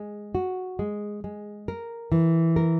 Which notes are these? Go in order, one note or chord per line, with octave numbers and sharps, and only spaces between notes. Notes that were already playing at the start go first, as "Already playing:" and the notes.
Already playing: G#3
F#4
G#3
G#3
A#4
E3
A#4